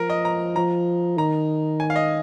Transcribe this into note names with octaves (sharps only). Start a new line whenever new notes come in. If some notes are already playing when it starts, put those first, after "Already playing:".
Already playing: F3 A#4
D#5
A#5
F3 A#5
D#3 A#5
G#5
F5
D#5